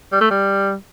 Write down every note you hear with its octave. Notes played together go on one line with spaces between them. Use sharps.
G3
A3
G3